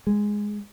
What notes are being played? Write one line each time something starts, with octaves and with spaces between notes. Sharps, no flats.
G#3